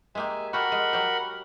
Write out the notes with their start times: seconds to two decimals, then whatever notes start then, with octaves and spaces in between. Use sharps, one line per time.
0.15 G#3 A#3 G4 E5 G#5
0.53 F#4 G4 A4 A#4 F#5 B5
0.72 G#3
0.93 F#3 G4